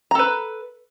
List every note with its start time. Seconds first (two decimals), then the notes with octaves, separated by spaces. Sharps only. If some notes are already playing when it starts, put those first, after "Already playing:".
0.11 A#5
0.15 A4
0.19 B4